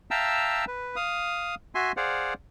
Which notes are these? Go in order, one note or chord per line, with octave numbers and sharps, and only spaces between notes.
E5 F5 G5 A5 A#5 E6
B4
F5 D#6
F#4 E5 G#5 C6
G#4 C5 D5 F5 F#5